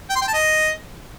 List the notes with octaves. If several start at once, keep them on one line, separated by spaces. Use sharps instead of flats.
G5
C6
G5
A5
D#5